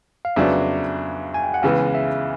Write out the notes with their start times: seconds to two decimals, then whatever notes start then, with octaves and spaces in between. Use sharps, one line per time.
0.25 F5
0.36 F2 C#3 F#3 B3 D4 E5
1.34 G#5
1.44 G5
1.54 F#5
1.62 C#2 C#3 E3 G#3 B3 F5
1.94 E5